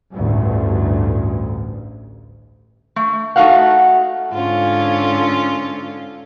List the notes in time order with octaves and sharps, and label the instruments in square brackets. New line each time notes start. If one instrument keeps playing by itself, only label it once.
[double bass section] A1 D2 G2
[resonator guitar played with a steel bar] A3
A3 D#4 F#4 F5 F#5
[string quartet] G#2 D3 C#4 F4